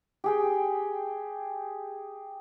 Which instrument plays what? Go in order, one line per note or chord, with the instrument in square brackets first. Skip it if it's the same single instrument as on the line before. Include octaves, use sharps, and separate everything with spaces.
[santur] G4 G#4 G5